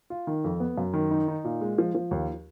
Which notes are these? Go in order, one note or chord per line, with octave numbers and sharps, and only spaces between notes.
F4
D#3
F2
B3
F#2
D#3
D#4
D#4
A#2
G#3
F3
F3
D#2